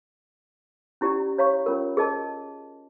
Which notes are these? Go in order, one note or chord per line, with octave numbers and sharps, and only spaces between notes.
C#4 E4 G4 D5 F#5 A#5
C#5 F5 A#5 C#6
C#4 F4 A#4
G#4 A#4 D#5 A5